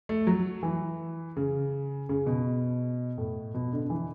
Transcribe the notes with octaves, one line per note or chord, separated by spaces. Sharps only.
A3
F#3
E3
C#3
C#3
B2
A2
B2
D3
D3
E3